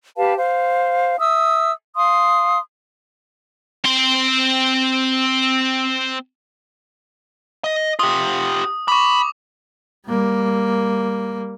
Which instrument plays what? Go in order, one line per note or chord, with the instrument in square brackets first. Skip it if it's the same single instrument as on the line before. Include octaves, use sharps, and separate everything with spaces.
[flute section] G4 B4 F5 A5
C5 F5
E5 D#6 E6
F5 C6 D#6
[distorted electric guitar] C4 C6
[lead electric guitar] D#5
[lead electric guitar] F4 G4 [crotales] D#6
[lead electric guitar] B5 [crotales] C#6 D6
[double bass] G3 A#3